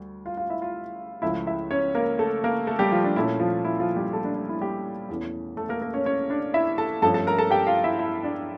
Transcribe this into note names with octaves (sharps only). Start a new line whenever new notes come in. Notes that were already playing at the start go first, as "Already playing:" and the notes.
Already playing: D2 G3
F4 F5
F4 F5
E4 E5
F4 F5
C#2 C#3 F3 A3 E4 E5
E4 E5
C#4 C#5
A#3 A#4
A3 A4
A#3 A#4
A3 A4
G3 G4
F3 F4
D4
A#2 A3 C#4 E4
F3 F4
E4
F3 F4
G3 G4
A3 A4
D4
D4
E4
G3 G4
E2 E3 A3 C#4
A3 A4
A#3 A#4
A#3 A#4
C#4 C#5
C#4 C#5
D4 D5
E4 E5
A4 A5
G2 F3 A3 C#4 A4 A5
A4 A5
A#4 A#5
A4 A5
G4 G5
F4 F5
E4 E5
E4 E5
D4 D5